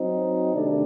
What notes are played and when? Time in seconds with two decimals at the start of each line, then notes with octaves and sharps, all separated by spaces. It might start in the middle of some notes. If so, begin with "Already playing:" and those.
Already playing: F#3 C4 D#4
0.53 C3 D#3 A3 D4 D5